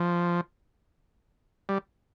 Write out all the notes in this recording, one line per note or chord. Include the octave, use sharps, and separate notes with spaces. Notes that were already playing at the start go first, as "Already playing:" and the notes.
Already playing: F3
G3